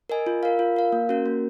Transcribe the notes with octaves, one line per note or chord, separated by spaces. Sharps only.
A#4 D#5 G#5
F4
A#4 F5
F4
A#4 F5
A#3
C#4 F#4 A#4
A#3